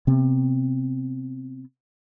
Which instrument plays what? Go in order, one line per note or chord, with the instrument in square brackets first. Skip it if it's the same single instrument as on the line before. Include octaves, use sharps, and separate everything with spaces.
[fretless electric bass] C3 B3 C4